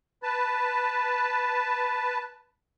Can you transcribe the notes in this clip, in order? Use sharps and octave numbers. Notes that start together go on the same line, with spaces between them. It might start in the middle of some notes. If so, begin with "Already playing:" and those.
B4 A5